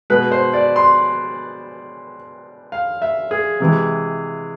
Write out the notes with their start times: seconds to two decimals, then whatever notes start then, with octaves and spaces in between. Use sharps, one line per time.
0.10 B2 G#3 B4
0.32 C5
0.54 D5
0.76 C6
2.72 F5
3.02 E5
3.31 G#4
3.60 C3 E3 G#3